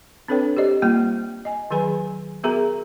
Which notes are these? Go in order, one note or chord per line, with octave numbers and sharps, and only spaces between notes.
C4 D4 A4 B4 C#5 G5
G4 C5 D5 D#5
G3 A#3 F4 G5
D#5 G#5
D#3 F#3 G#4 B4 G#5 B5
B3 F#4 G#4 A#4 E5 A#5